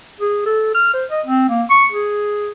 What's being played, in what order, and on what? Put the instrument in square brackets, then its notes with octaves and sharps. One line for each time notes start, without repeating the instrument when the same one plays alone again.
[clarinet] G#4
A4
F6
C5
D#5
C4
A#3
C#6
G#4